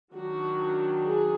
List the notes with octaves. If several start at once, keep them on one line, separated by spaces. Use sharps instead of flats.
D#3 F#3 D4 F#4
G#4